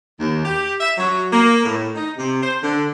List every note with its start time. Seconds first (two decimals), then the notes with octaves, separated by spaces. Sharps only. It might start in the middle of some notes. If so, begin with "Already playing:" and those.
0.19 D#2
0.44 G4
0.80 E5
0.98 F#3
1.32 A#3
1.64 A2
1.95 D#4
2.17 C3
2.42 C5
2.62 D3